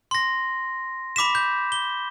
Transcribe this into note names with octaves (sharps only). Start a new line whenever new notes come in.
C6 A#6
B5 D6 B6 E7
G6
G7